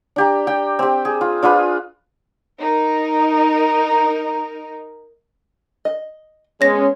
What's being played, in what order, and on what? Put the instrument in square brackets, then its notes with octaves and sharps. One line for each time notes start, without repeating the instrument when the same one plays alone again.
[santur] D4 G4 A#5
G4 G5
C4 G4
G#4
F4
D4 F4 G#4 B4
[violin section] D#4 A#4
[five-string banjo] D#5
[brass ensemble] G#3 C#4 [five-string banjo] B3 [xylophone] C#5 A#6